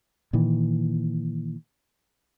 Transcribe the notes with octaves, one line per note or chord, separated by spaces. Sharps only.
A#2 D#3 E3